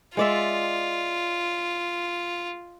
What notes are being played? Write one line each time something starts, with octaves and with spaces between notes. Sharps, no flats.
G#3 F4 D5 E5